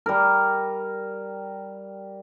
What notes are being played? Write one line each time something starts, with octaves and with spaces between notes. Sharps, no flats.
G3 A#4